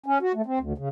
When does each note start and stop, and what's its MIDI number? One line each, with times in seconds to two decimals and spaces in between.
0.06 0.18 61
0.22 0.32 66
0.35 0.42 57
0.46 0.59 60
0.60 0.73 38
0.78 0.89 49